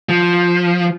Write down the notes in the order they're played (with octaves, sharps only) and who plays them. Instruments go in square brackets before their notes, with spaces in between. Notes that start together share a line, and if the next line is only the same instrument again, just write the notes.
[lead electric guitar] F3